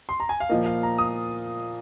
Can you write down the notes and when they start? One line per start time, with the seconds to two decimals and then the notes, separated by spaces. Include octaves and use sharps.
0.09 C6
0.20 A#5
0.29 G#5
0.40 F5
0.49 A#2 F3 A#3 D#5
0.66 F5
0.83 A#5
0.98 D#6